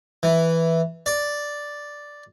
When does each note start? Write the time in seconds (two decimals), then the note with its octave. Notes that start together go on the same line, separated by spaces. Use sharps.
0.23 E3
1.06 D5